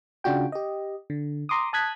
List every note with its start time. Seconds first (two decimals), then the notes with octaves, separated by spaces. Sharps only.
0.24 C#3 D4 F4 F#4 G5
0.52 G4 D#5
1.10 D3
1.49 A#5 C6 D6 D#6
1.73 A5 D#6 F#6 G#6 B6